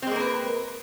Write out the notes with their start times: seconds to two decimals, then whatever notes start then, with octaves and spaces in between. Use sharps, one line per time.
0.02 C4
0.07 G#3
0.11 A#3
0.16 A#4
0.20 B4